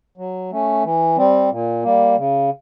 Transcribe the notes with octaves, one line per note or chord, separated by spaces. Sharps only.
F#3
A3 C#4
E3
G3 C4
A#2
G3 A#3
C#3